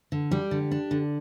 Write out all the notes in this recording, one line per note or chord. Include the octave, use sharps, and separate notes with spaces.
D3
G3 G4
D3
D4
D3